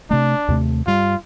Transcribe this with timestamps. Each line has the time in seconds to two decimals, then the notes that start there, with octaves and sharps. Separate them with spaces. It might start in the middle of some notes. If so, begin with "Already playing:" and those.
0.11 C3 A3 D4
0.48 D#2 C3 A3
0.87 G2 G3 F4